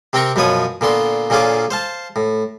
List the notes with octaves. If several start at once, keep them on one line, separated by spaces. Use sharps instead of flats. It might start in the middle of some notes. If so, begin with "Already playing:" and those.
C3 C4 A#4 G5 A#5 C#6
F#2 B2 F3 B4 C#5 D#6
A#2 D3 B3 C6
A#2 D3 C#4 F4 G#4 D6
C5 F5 A5
A2